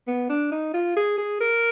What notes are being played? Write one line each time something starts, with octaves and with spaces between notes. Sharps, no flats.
B3
D4
D#4
F4
G#4
G#4
A#4